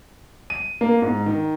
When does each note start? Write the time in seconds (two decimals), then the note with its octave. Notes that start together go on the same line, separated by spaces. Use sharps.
0.50 D#7
0.81 A#3
1.02 G#2
1.26 D#3